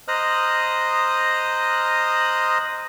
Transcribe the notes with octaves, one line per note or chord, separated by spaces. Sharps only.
C5 D#5 A#5 D#6 F6 F#6